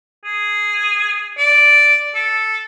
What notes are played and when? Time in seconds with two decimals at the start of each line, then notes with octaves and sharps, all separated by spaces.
0.25 G#4
1.38 D5
2.15 A4